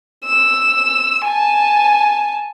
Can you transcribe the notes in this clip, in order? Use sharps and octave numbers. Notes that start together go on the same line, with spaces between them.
E6
G#5 A5